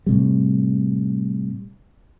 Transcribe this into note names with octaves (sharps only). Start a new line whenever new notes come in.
A2 C3 G3